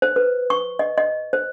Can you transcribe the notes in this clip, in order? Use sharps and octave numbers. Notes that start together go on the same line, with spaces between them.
C5
B4
C#6
D#5
D#5
C5